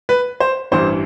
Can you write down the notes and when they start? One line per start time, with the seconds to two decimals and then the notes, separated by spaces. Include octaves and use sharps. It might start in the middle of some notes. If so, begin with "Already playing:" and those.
0.09 B4
0.40 C5
0.71 A1 G2 E3 C5